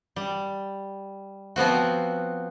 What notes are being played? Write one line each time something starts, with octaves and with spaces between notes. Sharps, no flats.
G3
F3 B3 C4 F#4